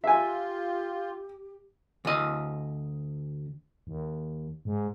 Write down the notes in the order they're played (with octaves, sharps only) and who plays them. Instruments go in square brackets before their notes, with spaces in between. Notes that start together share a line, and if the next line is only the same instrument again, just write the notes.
[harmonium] F4 [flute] G4 [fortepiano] E5 G#5
[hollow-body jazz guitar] D2 D#5
[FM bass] D#2
G#2